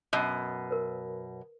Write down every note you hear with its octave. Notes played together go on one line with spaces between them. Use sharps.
F#2 B2 D#5
A#4 B4